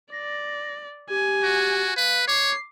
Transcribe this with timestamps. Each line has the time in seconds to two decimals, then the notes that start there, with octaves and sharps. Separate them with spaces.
0.12 D5 A#6
1.10 G4 G#5
1.43 F#4
1.97 B4 F5
2.28 C#5 D6 C7